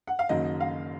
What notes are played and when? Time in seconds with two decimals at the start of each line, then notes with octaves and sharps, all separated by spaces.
0.07 F#5
0.19 F5
0.29 F#1 F#2 D#3 F#3 A#3 D#5
0.60 F5